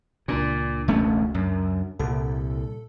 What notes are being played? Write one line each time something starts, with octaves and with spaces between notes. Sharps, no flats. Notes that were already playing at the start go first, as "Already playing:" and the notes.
C#2 A#2 D4
E1 A3 C#4
F#2
C2 A#2 A4